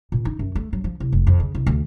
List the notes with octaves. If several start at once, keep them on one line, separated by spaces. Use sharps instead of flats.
A#2
D#4
F#2
A3
F#3
F3
C2
F1
F2
C#3
C2
D2